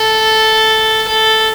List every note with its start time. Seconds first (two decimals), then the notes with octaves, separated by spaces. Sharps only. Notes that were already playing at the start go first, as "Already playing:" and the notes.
Already playing: A4
1.08 A4